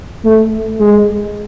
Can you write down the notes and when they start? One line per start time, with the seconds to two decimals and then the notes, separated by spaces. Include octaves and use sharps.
0.25 A3
0.80 G#3